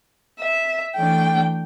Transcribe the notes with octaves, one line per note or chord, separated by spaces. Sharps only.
E5
E3 A3 D4 G5